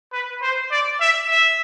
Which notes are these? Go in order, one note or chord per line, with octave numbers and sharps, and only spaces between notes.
B4
C5
D5
E5
E5